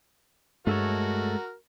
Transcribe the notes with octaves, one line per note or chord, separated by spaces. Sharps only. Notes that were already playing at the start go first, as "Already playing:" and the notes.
G2 G#3 A3 F#4 A4 A#4 C#5